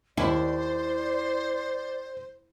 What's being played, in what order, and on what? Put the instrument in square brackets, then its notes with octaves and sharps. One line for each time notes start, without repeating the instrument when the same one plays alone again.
[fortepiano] D#2 [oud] E4 [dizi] C5 [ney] D5